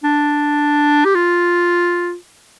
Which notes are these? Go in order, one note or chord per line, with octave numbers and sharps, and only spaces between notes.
D4
G4
F4